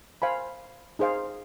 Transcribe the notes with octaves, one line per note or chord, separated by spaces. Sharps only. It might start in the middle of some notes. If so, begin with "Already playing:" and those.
C5 F5 G#5 B5
D#4 G#4 C5 F5